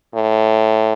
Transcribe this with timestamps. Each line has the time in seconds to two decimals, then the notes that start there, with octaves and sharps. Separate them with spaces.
0.15 A2